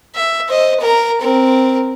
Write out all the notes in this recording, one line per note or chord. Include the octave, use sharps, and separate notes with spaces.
E5
C5 D#5
A#4 A#5
C4 A#4